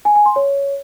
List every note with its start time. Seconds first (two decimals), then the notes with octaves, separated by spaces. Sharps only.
0.05 G#5
0.15 G#5
0.26 C6
0.36 C#5